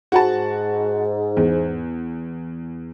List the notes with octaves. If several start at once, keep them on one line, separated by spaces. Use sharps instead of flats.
G#2 F#4 F#5 A5
E2